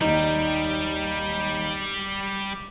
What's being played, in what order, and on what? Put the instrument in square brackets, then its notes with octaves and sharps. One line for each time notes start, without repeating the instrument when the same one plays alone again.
[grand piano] D#2 D#4 [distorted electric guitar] G3